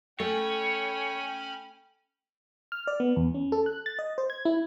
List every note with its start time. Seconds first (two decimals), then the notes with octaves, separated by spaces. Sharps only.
0.20 A3 C#4 C#5 G5 G#5 B5
2.72 F6
2.87 D5
3.00 B3
3.16 E2
3.35 C#4
3.52 A4
3.66 F#6
3.86 A6
3.99 D#5
4.18 C5
4.30 G#6
4.45 E4